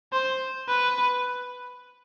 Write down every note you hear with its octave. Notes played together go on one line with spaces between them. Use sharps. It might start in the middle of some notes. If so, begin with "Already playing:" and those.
C5
B4